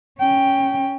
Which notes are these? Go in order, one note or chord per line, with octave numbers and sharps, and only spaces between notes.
C#4 G5